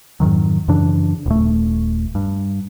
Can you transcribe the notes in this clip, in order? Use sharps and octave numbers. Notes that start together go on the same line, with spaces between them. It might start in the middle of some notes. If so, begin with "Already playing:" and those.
F2 G#2 D#3 F#3
F#2 C#3 E3 D4
D#1 A3
G2